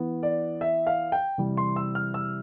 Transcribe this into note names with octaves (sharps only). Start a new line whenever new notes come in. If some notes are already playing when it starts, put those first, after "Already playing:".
Already playing: E3 B3
D5
E5
F5
G5
C3 E3 G3 C4
C6
E6
F6
E6